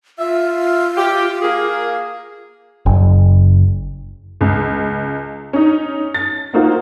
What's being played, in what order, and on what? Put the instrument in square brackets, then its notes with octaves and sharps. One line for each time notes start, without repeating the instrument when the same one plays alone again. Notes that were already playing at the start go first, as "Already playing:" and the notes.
[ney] F4 [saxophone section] E5
[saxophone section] G4
A#3 G#4
[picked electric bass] F#1
[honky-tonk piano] C#2
C#4 D#4
A6
A#3 D#4 F4 F#4 C5